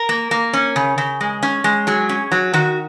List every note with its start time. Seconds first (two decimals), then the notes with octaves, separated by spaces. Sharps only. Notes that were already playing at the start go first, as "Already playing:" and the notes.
Already playing: A#4
0.09 A#3
0.31 A#3
0.53 C#4
0.76 C#3
0.98 C#3
1.21 G#3
1.43 C#4
1.64 G#3
1.87 F#3 G#4
2.09 C#4
2.32 F#3
2.53 D#3 F#4